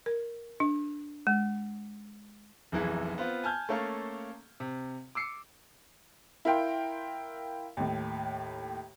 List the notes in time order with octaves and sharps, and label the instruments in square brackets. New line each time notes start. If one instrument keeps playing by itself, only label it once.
[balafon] A#4
D4
G#3
[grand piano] F1 B1 E3 G#4
B3 C4 F4
G#5 A5 F6 G6 G#6
A3 A#3 C#4 A4 F5
C3
D6 E6 C7 C#7
[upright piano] E4 A#4 F5 G5 C6
D#2 A2